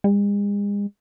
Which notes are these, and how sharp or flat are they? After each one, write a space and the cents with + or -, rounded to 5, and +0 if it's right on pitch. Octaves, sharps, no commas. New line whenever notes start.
G#3 -40